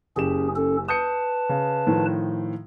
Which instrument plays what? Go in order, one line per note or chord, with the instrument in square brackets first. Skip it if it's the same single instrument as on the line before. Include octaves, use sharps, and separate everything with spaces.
[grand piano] F#1 G4 E7 [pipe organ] C#4 G#4
[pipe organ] C#4 A4
[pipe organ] B4 A5 [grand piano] D#6 G6 C#7
[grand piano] C#3
A2 D#3 F3